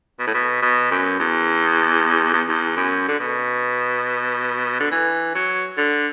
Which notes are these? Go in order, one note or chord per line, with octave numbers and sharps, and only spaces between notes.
B2
A2
B2
B2
F#2
E2
E2
E2
F#2
D3
B2
D3
E3
F#3
D3